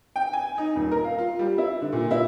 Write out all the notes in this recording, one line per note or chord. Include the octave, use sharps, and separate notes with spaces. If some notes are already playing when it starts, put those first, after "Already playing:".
G5
G#5
D#4
D#1
A#4
F5
F4
G3
E4
D3
A#2
E4